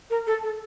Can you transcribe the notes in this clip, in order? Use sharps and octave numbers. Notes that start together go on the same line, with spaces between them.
A#4
A4
A4